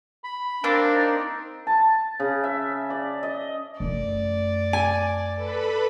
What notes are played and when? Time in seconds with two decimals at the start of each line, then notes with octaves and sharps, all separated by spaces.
0.24 B5
0.64 A#3 C4 D4 A#4
0.94 D#4
1.67 A5
2.20 C#3
2.43 E5
2.90 D5
3.23 D#5
3.80 F#2 A3 D5
4.73 G#5
5.33 A4 B4 B5